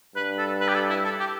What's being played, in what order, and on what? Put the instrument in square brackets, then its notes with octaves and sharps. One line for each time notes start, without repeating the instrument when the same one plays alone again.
[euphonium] G2 [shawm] B4
[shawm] A4
B4
G4
A4
E4
A4
G4